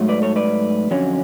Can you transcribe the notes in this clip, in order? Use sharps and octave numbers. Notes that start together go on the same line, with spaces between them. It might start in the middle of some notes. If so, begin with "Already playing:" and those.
Already playing: G#2 F#3 A3
B4 D5
A4 C#5
B4 D5
F2 D3 F#3 C#4